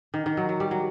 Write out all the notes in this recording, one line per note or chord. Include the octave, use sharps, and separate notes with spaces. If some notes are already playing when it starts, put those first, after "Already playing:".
D#3
D#3
F#3
F#3
G3
F#3